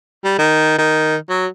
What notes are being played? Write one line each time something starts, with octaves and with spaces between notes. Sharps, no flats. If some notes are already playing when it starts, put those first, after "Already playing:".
G3
D#3
D#3
F#3